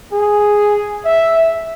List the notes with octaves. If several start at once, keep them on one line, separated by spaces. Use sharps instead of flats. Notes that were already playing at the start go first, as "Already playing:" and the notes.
G#4
E5